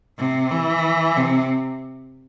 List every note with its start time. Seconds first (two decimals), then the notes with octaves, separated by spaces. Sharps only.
0.18 C3
0.51 E3
1.17 C3